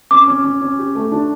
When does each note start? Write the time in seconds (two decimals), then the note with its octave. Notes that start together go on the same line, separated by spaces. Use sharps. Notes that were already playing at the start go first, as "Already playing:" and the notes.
0.11 C#4 D6
0.28 C#4
0.45 C#4
0.61 C#4
0.79 G4
0.95 A3
1.12 D4